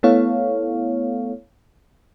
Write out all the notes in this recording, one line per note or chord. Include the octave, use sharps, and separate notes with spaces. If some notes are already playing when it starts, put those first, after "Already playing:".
A3 B3 E4 A4 C#5 F5